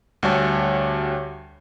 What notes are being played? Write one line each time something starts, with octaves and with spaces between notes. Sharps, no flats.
D2 G3 F#4 C#5 A5